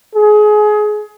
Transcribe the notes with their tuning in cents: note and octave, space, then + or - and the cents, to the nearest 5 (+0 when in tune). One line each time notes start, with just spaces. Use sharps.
G#4 +25